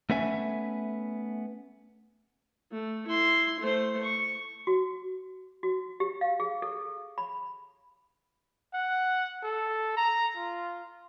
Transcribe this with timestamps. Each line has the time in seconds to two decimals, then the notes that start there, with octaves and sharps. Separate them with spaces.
0.10 A3 B3 C#4 E5 G#5
2.71 A3
3.06 E4 C6
3.60 A3 C5
4.03 C#6
4.67 F#4
5.63 F#4
6.00 G4
6.21 F5
6.40 G#4
6.62 A4
7.18 B5
8.74 F#5
9.43 A4
9.97 A#5
10.37 F4